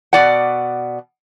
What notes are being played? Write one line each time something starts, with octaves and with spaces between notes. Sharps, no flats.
B2 D5 F#5